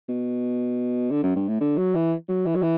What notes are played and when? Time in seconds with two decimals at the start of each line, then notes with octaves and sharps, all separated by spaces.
0.08 B2
1.10 D3
1.23 F#2
1.36 G2
1.48 A2
1.60 D3
1.77 F#3
1.95 E3
2.28 F#3
2.46 E3
2.55 F#3
2.62 E3